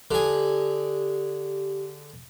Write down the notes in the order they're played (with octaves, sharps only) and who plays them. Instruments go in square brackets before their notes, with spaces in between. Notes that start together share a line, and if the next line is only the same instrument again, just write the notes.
[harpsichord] D3 G#4 [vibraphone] G4